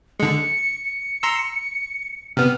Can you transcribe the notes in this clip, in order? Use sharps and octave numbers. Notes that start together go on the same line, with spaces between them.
D3 G#3 C#7
C#7
A#5 C6 E6
C3 B3 F6